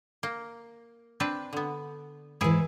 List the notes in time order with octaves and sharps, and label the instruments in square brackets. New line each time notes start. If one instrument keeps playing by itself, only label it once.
[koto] A#3
C4 D4 B4
D3 B3
[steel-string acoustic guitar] G#2 E3 [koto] E4 G#4